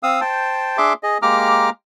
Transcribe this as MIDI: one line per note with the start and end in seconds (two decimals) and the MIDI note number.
0.03 0.21 60
0.03 0.21 77
0.03 0.21 87
0.03 0.21 88
0.21 0.77 72
0.21 0.77 79
0.21 0.77 81
0.78 0.93 62
0.78 0.93 68
0.78 0.93 76
0.78 0.93 84
0.78 0.93 86
1.03 1.18 68
1.03 1.18 75
1.22 1.70 56
1.22 1.70 58
1.22 1.70 67
1.22 1.70 82
1.22 1.70 86
1.22 1.70 89